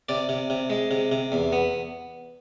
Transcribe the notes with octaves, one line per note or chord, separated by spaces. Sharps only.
C3 D5
C3
C3
G#3
C3
C3
E2
B3